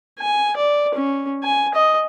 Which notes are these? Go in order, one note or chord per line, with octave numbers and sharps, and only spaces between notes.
G#5
D5
C#4
G#5
D#5